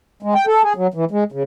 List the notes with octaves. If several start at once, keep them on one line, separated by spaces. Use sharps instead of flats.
G#3
G5
A4
G#4
F#3
E3
G#3
C#3